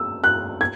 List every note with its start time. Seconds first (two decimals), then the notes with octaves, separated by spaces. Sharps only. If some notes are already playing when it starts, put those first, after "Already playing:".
Already playing: E6
0.24 F#6
0.61 G#6